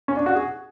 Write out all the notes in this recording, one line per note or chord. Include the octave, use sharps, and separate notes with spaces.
C#4
D4
F#4
G#4